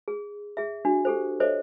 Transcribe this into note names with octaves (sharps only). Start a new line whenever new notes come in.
G#4
G#4 E5
D4 F#4
G4 A4 C5
A4 C5 C#5 D#5 E5